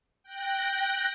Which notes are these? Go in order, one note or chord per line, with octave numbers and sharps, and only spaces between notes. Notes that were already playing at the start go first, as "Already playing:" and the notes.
G5 F#6 A#6